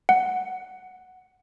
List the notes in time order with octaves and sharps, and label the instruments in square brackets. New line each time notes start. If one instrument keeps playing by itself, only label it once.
[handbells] F#5